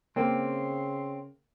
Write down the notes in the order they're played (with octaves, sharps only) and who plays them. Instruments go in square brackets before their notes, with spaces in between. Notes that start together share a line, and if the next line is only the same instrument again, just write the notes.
[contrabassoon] C#3 [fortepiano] A#3 [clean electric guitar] C4 [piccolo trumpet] C6